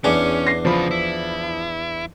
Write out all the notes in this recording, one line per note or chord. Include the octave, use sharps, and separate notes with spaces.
E2 C#4 D4 G#4
A#6 C7
C#3 F3 F4 B5
E4